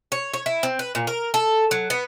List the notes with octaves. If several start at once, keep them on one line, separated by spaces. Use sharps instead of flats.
C#5
C#5
E4
C4
B4
A#2
A#4
A4
F#3
B3